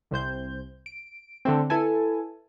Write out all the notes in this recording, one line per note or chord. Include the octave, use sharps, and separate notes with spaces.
C2 C3 C5 G6
D7
D3 A3 C4
E4 A4 B4 G#5 A5